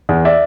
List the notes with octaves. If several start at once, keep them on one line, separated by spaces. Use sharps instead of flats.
E2
D5 E5